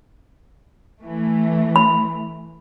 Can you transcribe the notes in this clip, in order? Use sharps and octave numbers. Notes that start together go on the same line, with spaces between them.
E3 A3
B5